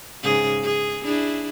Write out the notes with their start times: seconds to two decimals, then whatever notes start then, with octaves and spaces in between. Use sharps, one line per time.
0.23 G#2 C#3 G#4
0.64 G#4
1.05 D4 E4 G#4